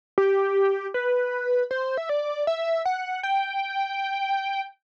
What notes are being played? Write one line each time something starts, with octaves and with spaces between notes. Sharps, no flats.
G4
B4
C5
E5
D5
E5
F#5
G5